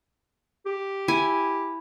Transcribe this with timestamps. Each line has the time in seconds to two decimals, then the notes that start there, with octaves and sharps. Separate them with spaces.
0.66 G4
1.08 E4 G#5